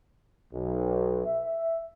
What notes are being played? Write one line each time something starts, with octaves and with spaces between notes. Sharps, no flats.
B1
E5